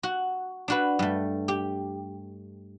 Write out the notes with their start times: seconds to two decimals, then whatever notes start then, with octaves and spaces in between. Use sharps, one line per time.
0.03 F#4
0.68 D4 F#4 B4
0.99 G2 A3
1.48 G4